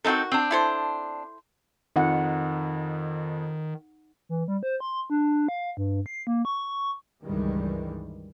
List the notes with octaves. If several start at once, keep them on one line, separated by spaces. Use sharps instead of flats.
D#3 C4 D#4 F#4 A4
C4 D4
E4 A4 C5
F2 D#3 D#4 F#5
E3
G3
C5
C6
D4
F5
G2
C7
A#3
C#6
C#2 G2 D#3 E3 G3 G#3